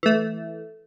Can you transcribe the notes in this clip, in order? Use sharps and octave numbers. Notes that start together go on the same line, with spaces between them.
E3 A3